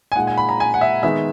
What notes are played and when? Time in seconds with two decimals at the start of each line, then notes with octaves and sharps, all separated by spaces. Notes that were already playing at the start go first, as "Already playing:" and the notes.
0.12 G#5
0.16 A#2 G#3 D#4 F#5
0.27 G#5
0.37 B5
0.49 A#5
0.60 G#5
0.74 F#5
0.81 E5
1.03 D#3 G#3 B3 D#4 E5